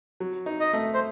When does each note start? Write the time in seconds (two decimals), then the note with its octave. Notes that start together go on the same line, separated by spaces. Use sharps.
0.20 F#3
0.46 D#4
0.60 D#5
0.73 A3
0.94 C5